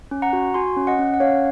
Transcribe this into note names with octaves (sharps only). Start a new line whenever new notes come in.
C#4
F#5 A#5
F#4
F#4 G#5 C6
C#4
D#5 F#5
C#4
F#5
C#4 C#5 F5